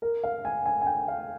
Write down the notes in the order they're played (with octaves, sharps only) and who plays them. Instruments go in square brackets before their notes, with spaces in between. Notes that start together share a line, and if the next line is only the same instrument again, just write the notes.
[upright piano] A#4
F5
G#5
G#5
G#5
G5
F5